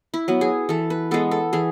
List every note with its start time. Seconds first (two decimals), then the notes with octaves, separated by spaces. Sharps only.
0.14 E4
0.28 F#3 B3
0.41 G#4
0.69 E3 A4
0.90 B4
1.11 G#3 B3 A4
1.31 A4
1.53 E3 G#4